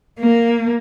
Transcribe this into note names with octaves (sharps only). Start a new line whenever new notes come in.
A#3